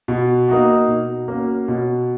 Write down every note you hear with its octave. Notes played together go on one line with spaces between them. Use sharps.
B2
A#3 D#4 F#4
B2
A#3 C#4 F#4
B2